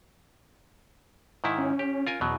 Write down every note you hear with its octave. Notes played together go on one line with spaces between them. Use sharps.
G#2 D#3 E4
C#4
G4
F4 A#4 G#5
E2 B2 F#3